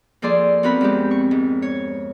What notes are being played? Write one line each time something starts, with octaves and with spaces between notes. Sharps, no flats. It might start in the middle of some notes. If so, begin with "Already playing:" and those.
F3 A#3 G#4 A4 D5 C6
B3 C4 F#4 A#4 B5
F2 G#3 G4
C#6
G#2
C#5